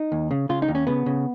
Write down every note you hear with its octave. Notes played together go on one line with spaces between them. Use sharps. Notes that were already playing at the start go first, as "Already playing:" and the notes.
Already playing: D#4
D#2
C#3
C#3 F4
D#4
D#2
C#4
C#3 B3
C#3